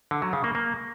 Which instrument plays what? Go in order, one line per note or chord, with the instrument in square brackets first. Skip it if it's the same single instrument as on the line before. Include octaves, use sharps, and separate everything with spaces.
[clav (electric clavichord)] D3
F#3
C#3
A#3
A#3